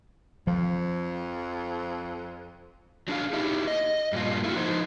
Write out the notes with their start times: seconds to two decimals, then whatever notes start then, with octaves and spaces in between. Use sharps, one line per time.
0.47 F2 F3
3.08 F#3 D4 G#4 F5
3.33 D#4 E4 G4
3.67 D#5
4.13 G2 A#2 F4
4.44 A3 E4 F#4
4.56 F3 D#4 C5